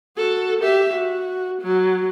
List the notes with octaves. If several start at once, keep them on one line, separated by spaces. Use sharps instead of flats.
F#4 A4
G4 E5
F#4
F#3